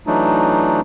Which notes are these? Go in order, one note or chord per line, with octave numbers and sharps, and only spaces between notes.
E3 F#3 A3 D4 D#4